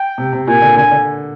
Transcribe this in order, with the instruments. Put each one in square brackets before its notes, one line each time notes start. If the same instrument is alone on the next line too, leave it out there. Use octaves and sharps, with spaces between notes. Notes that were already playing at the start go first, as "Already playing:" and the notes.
Already playing: [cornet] G5
[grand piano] C3
C3
[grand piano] A#2 [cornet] G#5
[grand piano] D3
[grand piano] D3 [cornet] G#5
[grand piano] D3